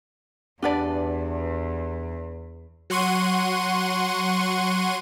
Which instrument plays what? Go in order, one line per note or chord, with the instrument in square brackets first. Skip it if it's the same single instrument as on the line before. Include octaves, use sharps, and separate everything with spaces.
[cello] E2 [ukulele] D4 B4 D5 [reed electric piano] G4 F#5 A5
[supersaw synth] F#3 F#5 C6 C#6 D#7